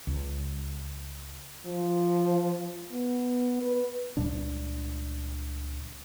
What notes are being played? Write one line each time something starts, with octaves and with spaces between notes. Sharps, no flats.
C#2
F3
B3
B4
C#2 A#2 G3 D4